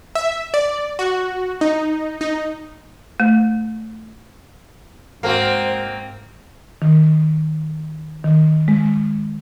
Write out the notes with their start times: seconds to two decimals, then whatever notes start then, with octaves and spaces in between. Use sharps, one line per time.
0.15 E5
0.54 D5
0.99 F#4
1.61 D#4
2.21 D#4
3.20 A3
5.23 G#2 A#3 C4 F#4 A#4 C5 F5
6.82 D#3
8.24 D#3
8.68 G#3